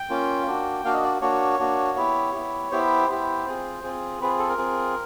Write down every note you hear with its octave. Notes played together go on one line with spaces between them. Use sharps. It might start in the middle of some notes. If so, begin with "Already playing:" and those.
Already playing: G5
A#3 C#4 F4
A#3 D4 F#4
A#3 D4 F#4 F5
D#5
D5
A#3 D4 F#4 C#5
A#3 D4 F#4
B3 E4 G4
B3 E4 G4
B3 E4 G4 C5
B3 E4 G4
C4 F4 G#4
C4 F4 G#4
C4 F4 G#4 B4
A4
A#4
C4 F4 G#4